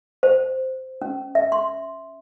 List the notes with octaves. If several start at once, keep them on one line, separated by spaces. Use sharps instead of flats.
C5
C#4
E5
C6